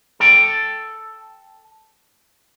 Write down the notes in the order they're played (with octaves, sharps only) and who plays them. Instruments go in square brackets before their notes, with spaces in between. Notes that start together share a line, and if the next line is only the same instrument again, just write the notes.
[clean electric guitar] A4 G5